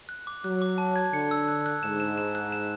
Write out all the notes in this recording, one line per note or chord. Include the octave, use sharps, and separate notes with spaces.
F#6
D6
F#3 F#6
D6
A5
G#6
D3 C#7
E6
F#6
F#6
G#2 E7
E7
E7
F#6
E7